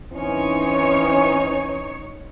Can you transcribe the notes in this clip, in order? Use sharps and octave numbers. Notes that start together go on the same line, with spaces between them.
E3 C4 C#4 D#4 C#5